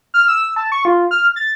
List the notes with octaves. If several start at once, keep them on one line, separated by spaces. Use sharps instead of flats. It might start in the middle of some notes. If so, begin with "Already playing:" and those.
F6
E6
A5
C#6
F4
F6
A6